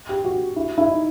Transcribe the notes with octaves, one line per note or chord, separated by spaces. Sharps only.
G4
F#4
E4
E4
D#4